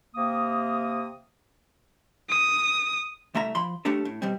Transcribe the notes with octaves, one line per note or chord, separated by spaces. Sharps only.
C3 A#3 D#6
D#6
C2 A3 E5 A#5
F3 B5 C6
A3 C#4 D4 G4 A4
A2
B2 G3 C4